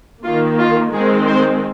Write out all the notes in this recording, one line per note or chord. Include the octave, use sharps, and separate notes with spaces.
D#3 A#3 F4
F4
D#3 G#3 C4 G#4
C5